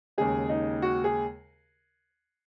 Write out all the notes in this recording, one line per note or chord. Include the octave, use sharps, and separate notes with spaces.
D#2 C#3 G#3 G#4
D#4
F#4
G#4